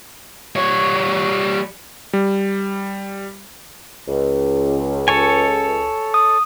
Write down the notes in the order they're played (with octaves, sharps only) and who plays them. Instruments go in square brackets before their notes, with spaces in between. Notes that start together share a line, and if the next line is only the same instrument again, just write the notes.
[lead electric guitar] G3 C#5
[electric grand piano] G3
[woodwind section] C#2
[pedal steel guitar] A4 C#5 G#5
[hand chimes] D#6